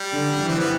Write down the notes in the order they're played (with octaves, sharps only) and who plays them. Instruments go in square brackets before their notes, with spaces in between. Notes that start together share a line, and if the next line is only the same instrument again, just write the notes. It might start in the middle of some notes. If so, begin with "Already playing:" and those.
Already playing: [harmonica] G3
[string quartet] D3
E3
[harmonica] C4
B3